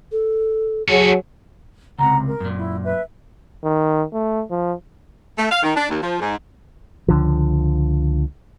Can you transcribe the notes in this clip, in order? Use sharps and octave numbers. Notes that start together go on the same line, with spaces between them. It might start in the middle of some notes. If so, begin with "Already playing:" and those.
A4
F#3 F#4 G#4 A4
C#2 A2 C3 F#5 A#5
A#4
F#2 A#2
E4
B4 E5
D#3
A3
F3
A3
F5
D#3
D4
D#2
F3
G#2
C#2 D3 F3